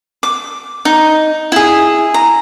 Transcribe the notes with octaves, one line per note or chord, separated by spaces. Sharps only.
D6
D#4
E4 G#4
A#5